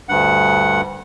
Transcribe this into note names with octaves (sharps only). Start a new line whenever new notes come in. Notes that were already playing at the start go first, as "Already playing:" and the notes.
D2 G2 F#5